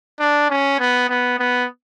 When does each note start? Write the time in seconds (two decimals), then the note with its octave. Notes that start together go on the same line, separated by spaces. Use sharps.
0.20 D4
0.50 C#4
0.79 B3
1.09 B3
1.39 B3